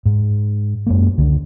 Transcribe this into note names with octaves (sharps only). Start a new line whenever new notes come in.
G#2
F#2 G#3 A#3
C#2 D3